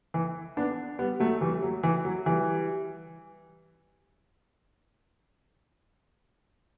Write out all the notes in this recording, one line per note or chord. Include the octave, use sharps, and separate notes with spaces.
E3
B3 D4
G3 B3
F#3 A3
E3 G3
F#3
E3
F#3
E3 G3